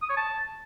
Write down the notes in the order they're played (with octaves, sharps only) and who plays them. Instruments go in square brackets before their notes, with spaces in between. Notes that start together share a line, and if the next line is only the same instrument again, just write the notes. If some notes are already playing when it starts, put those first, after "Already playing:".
[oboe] D#6
C#5
A5